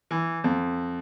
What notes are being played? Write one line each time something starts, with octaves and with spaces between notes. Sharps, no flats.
E3
F2